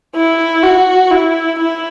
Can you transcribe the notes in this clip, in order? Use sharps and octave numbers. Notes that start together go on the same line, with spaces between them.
E4
F#4
E4
E4